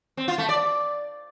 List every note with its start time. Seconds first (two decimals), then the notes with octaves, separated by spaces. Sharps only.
0.17 C4
0.28 F4
0.38 A3
0.49 D5